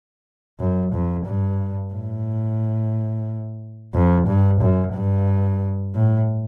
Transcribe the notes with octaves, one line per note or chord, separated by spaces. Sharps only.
F#2
F2
G2
A2
F2
G2
F#2
G2
A2